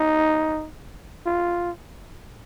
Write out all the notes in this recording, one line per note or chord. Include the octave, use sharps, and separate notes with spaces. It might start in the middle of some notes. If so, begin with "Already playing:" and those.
Already playing: D#4
F4